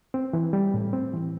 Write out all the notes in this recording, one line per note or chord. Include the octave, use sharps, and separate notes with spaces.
C4
E3
G3
A2
C4
E3